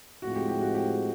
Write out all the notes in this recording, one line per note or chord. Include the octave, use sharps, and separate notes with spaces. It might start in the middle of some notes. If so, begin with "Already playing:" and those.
A2 F3 G#3 C4 F#4
G4
G4
F#4
G4